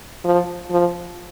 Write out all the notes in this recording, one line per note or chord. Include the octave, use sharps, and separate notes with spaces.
F3
F3